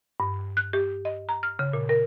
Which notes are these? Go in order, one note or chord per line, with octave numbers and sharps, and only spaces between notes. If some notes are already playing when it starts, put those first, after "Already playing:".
G2
F#6
G4
D#5
A#5
F6
C#3
A#2
A#4